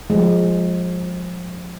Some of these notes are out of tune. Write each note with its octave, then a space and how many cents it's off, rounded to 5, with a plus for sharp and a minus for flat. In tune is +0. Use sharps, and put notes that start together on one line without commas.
F3 +30 G#3 +0